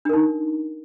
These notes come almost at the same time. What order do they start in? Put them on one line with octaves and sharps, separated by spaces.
D4 A#4 D#4